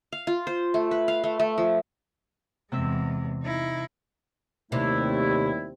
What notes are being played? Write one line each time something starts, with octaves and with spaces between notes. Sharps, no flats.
F5
F4
C5
A3
B4
F5
A3
A3
F3
E2 C3 G#3 C4 E5
D#4 E4
D#2 C3 G3 A3 E4